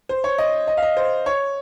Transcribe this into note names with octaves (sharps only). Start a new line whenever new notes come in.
C5
C#5
D#5
D#5
F5
D#5
C5
C#5